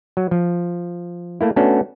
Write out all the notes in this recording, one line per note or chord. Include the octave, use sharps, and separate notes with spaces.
F#3
F3
A3 A#3 E4
A3 B3 C#4 D4 F#4